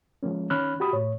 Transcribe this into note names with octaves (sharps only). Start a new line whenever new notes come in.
F3 G#3 A#3 C#4
D#3 C#4 B5 F6 F#6
F#4 G4 B5 D#6
A2 C#5